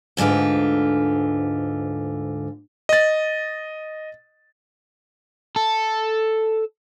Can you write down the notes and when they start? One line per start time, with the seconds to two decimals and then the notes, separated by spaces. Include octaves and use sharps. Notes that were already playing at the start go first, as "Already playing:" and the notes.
0.17 D2 G#2 D3 F4 B4
2.89 D#5 A6
5.56 A4